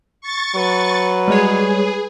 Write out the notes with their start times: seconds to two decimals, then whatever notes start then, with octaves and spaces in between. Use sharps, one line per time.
0.21 C#6 A6
0.55 F#3 B4
1.28 G3 G#3 G#4 C#5